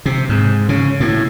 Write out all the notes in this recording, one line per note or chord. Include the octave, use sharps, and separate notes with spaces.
C3
G#2
C#3
A2